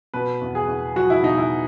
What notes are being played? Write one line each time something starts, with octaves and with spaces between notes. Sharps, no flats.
B2 B4
E2
G#4
E2
F#3 F#4
E4
B2 D#4
E4